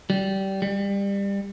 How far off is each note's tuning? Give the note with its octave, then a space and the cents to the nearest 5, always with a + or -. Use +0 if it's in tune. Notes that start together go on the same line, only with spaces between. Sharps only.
G3 -20
G3 +25